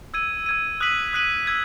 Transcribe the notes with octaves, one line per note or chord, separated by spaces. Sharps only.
E6 G#6 D#7
E6 G#6 D#7
D#6 F#6 B6 D#7 F#7
D#6 F#6 B6 D#7 F#7
E6 G#6